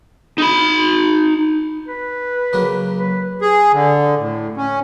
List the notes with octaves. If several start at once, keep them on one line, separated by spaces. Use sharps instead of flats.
D#4 B5
B4
C#3 F#3 A#3
B4
G#4
D3
A2
C#4